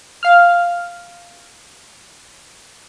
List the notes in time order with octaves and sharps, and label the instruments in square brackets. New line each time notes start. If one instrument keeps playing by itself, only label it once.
[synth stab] F5 F6